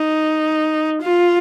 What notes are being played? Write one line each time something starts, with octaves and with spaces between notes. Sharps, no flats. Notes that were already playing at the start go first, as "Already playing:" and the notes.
Already playing: D#4
F4